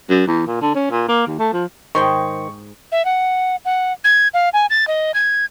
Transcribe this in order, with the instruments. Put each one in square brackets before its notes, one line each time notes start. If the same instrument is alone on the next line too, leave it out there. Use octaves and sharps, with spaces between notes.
[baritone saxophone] F#2
E2
A#2
D3
C#4
A#2
A#3
D#2
A3
F3
[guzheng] G#2 G#4 G5 [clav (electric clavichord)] D#3 C5 [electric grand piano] C#6
[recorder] E5
F#5
F#5
G#6
F5
G#5
A6
D#5
G#6